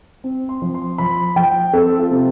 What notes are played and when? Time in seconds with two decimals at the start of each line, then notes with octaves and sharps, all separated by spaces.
0.24 C4
0.49 C6
0.62 F3
0.74 C6
0.98 F3 B5
1.36 F3 G5
1.73 C4 A4
1.98 F4
2.11 C3